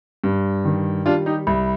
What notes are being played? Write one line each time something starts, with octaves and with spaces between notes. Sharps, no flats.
G2
D#3
G3 D4 F4
D#4 G4
C2